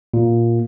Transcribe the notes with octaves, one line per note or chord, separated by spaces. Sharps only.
A#2